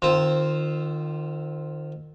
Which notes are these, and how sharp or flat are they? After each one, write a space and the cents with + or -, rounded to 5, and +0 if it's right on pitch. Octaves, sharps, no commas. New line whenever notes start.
D#3 -35 C4 +0 F4 +0